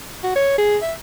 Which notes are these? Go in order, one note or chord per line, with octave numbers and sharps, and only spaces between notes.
F#4
C#5
G#4
E5